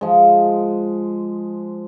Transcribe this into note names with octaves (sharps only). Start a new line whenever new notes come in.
F3 G#3